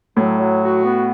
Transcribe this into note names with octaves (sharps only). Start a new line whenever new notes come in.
A2 F#3
F#3
F#4
B3